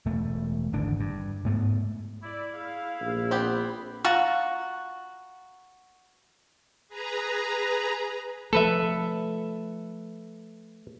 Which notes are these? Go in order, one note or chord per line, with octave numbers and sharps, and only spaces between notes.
E1 A3
G#1 D3 E3 D4
G2
G#2 A3 B3
E4 D5
G#4 F5
A#1
B3 C4 G4 B5
F4 F#4 A#5
G#4 B4 A#5
F3 A3 A4 B4 E5